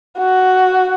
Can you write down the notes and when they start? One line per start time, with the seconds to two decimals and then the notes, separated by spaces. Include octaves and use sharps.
0.18 F#4